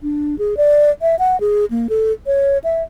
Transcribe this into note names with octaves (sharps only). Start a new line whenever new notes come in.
D4
G#4
D5
E5
F#5
G#4
A#3
A4
C#5
E5